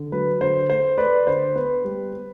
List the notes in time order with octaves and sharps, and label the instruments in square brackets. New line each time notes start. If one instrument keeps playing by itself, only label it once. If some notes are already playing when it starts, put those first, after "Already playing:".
Already playing: [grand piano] D3
F#3 B4
D3 C5
A3 C5
A3 B4 D5
D3 C5
B3 B4
G3
B3